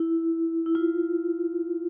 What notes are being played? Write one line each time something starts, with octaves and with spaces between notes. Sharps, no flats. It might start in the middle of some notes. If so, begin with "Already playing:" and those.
Already playing: E4
E4
F4